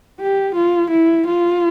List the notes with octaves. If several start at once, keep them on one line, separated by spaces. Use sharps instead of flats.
G4
F4
E4
F4